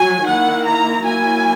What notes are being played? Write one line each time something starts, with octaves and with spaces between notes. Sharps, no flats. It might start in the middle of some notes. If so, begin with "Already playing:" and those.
Already playing: F#3 G#5
D#3 A#3 E4 F#5
A#5
F#3 A#3 E4 G#5